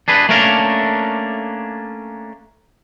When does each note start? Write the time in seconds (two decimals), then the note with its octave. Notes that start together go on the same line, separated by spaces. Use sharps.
0.08 D4 G#4 B4
0.29 A3 A#3 C#4 D4 A#4